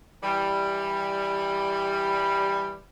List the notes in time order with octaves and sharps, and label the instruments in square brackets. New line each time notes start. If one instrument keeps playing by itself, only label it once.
[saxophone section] E3 G3